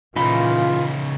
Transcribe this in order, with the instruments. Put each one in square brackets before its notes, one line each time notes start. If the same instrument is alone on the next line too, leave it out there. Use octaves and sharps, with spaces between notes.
[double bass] A#2 E3 [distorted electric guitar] C#3 D#4 [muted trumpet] F4 [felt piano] B5